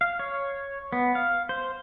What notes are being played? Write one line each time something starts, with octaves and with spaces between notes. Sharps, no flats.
F5
C#5
B3
F5
C5